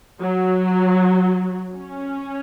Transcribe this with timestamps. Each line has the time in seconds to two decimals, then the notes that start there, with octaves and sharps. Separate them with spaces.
0.20 F#3
1.76 C#4